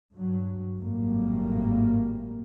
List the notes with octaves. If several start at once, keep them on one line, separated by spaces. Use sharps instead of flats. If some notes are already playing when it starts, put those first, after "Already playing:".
G2 F#3
G#1 F#2 A2 G3 A#3